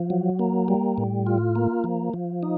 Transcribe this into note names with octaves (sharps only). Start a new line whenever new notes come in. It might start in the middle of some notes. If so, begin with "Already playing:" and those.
Already playing: F3
F#3
A#3
G3
A2
F4
A#3
F3
F3
D#4